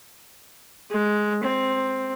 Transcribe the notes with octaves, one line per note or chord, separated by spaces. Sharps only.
G#3
C4